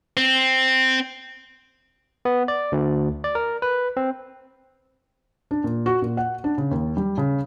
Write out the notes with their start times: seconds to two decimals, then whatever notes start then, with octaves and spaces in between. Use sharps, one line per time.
0.17 C4
2.25 B3
2.48 D5
2.72 D2
3.24 D5
3.35 A#4
3.62 B4
3.97 C4
5.51 D4
5.64 A#2
5.86 F#4
6.02 A#2
6.17 F#5
6.44 D4
6.58 C#3
6.71 D#2
6.97 G3
7.18 C#3